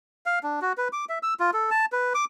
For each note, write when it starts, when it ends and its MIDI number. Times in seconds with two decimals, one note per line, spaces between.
0.26 0.39 77
0.43 0.60 62
0.62 0.73 66
0.78 0.88 71
0.93 1.05 86
1.09 1.19 76
1.23 1.34 88
1.40 1.51 65
1.54 1.70 69
1.71 1.86 81
1.92 2.13 71
2.14 2.25 86